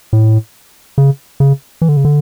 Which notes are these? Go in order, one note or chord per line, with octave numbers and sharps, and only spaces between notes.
A2
C#3
C#3
E3
D3
C#3
D3